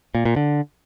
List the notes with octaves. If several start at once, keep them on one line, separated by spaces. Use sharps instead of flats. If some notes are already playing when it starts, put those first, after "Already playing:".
A#2
A#2
D3